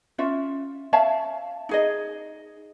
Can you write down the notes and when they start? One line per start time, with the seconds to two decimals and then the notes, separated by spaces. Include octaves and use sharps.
0.18 C#4 F4 E5
0.93 C#5 E5 F5 A5
1.69 D#4 G#4 D#5